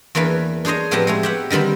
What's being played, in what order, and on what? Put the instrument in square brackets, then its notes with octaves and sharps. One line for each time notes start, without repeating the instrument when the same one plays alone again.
[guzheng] E2 E3 A#3 D4 B4 C#5
D4 G#4 C5 C#5 D#5
A2 F3 B3 C4 G4 A#5
G#3 A3 C#5
G4 E5 F#5
D3 D#3 G3 C4 B5